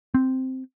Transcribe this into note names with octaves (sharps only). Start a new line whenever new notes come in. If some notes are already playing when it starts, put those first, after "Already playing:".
C4